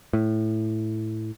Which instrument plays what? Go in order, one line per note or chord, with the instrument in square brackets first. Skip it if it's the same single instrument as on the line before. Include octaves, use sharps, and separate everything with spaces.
[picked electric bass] A2